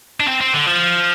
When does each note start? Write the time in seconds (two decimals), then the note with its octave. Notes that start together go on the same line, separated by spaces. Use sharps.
0.20 D4
0.28 C4
0.41 C4
0.54 D3
0.67 F3